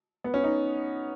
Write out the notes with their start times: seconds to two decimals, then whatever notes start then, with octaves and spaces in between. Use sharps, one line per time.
0.24 B3
0.34 C#4
0.44 D#4